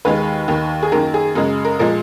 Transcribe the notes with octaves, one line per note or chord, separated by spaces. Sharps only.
D#2 D#3 G#3 B4
D#2 D#3 A#3
G#4
F#2 D#3 A#3 A#4
G#4
F#2 C#3 G#3 A#4
A#4
A#2 F3 G#3 A#4